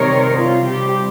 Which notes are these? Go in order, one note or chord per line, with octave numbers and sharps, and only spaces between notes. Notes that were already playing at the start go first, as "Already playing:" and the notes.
Already playing: C3 D#3 G3 C4 D#4 A#4 C#5
F4
C3 G3 C4 G4